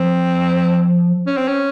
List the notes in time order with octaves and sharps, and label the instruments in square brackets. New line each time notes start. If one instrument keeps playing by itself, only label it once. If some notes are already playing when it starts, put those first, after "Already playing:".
Already playing: [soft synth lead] F3 [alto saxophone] C4
[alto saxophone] C#4
C4
C#4